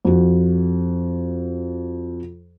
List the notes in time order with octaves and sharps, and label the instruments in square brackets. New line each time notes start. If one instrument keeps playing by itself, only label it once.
[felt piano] F2 F#4